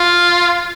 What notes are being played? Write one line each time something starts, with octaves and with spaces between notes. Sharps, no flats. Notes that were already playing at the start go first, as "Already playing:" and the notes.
Already playing: F4